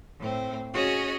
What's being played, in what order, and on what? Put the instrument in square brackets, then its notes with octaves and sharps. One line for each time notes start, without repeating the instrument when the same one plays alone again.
[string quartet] A2 C4
C#4 F#4 G#4 C#5 D#5